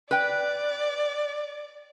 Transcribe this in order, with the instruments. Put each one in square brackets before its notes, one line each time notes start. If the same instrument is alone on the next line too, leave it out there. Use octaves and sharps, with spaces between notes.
[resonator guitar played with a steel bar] B4 G5 [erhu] D5